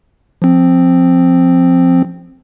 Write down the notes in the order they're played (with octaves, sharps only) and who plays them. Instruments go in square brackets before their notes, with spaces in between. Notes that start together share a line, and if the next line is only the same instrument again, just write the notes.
[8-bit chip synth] F3 C4